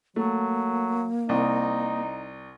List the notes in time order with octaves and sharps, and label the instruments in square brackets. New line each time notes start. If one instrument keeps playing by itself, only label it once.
[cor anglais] F#3 [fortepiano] A3 [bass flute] A#3
[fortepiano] C2 [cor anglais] D#4